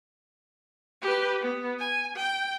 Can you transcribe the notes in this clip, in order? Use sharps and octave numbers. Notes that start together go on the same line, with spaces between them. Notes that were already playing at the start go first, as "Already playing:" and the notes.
G4 B4
B3
G#5
G5